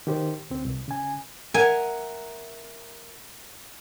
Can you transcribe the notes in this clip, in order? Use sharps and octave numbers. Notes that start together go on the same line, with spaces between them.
D#3 G4 C5
D2 C4
C2
C#3 G#5
A#4 E5 F#5 G#5